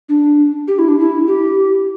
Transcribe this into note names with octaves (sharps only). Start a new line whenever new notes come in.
D4
G4
E4
D4
E4
G4